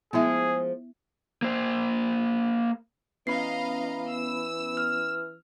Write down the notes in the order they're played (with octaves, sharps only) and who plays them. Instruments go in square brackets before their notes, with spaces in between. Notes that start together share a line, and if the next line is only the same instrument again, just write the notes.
[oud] F3 G#3 [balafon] B3 E4 E5 [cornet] G#4
[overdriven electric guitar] A#3 C5
[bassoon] E3 [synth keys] B3 C#4 B5 [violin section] D#5 F5 A#5 [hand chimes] C7
[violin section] E6
[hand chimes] F6